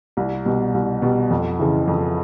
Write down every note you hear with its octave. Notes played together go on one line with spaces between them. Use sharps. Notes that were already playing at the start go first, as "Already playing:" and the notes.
C2
B2 G3
C2
B2 G3
F2
C#3 E3
F2